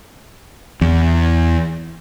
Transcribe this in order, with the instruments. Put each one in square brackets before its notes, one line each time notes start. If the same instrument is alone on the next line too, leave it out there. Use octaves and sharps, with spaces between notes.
[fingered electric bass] E2